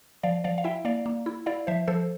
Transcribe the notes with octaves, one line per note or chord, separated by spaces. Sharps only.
F3 D5 F5
F3 D5 F5
F5
E4 E5 G5
A#3 D5 F5
A#3
E4
E4 D5 F5
F3 C5 E5
F3 A4 C5